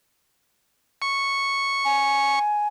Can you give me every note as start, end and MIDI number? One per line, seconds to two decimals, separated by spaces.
1.02 2.39 85
1.85 2.68 80